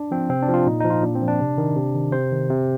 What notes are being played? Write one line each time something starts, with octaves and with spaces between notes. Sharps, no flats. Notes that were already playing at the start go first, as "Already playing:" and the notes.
Already playing: D4
F3 C4
C3 C4
D4
F3
F4
A#2 D#4
F3 D#4
F4
A#2 D4
C4
F3
D4
C3
D#3
C3
D#3
C3 C5
D#3
C3